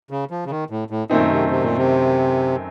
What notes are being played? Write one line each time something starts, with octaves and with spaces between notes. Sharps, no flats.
C#3
F3
C#3
D#3
A2
A2
F#2 A#2 D#3 A3 C4 D#4
C3
C3
A#2
C3